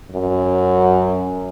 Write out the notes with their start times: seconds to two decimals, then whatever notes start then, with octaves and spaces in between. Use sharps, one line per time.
0.12 F#2